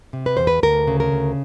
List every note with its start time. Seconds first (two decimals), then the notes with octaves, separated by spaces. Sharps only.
0.13 C3
0.26 B4
0.37 E2 C5
0.47 B4
0.63 D2 A#4
0.87 C#3
1.00 A#4
1.12 D2